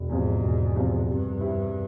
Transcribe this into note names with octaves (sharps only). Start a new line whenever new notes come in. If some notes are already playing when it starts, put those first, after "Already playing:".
Already playing: E1
E2 G#2 C3 F3
E1
E2 C3 F3
G2 C3
G3 C4 E4